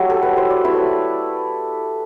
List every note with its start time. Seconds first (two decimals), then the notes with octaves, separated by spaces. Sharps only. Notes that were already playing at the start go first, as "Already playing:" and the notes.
Already playing: F#3 A3 E4 G4
0.10 A4
0.23 B4
0.37 C5
0.50 D5
0.64 A3 E4 B4